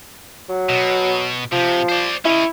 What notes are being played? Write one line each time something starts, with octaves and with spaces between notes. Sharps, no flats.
F#3
B2
C3 F3
C5 D5
C#4 E4 D#5